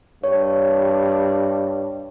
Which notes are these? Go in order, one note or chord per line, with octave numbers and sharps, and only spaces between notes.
G2 C#5